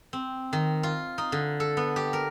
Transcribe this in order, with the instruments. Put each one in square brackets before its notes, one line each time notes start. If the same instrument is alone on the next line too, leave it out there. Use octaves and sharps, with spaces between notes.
[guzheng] C4
D#3
F4
D#4
D3
A4
B3
G4
A#4